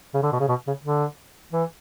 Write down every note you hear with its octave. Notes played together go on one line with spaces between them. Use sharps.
C#3
D3
B2
C#3
B2
C#3
D3
E3